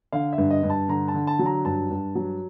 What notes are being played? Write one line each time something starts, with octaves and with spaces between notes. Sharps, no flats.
D3 F5
E5
G2
D#5
G2
A5
D3 A#5
A5
D3
A5
F#3
A#5
G2 A5
G2
F#3